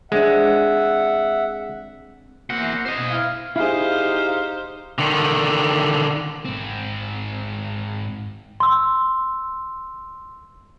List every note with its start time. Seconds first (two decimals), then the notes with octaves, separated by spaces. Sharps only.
0.12 G#3 C4 D4 E5 F#5
2.50 E2 A#3 C4 F#4 F#5
2.85 C5 D#5
2.97 B2 G#5
3.11 E4 F5
3.56 D#4 E4 G4 G#4 C5 F5
4.98 D3 D#3
6.45 G#2 C4
8.60 C6 E6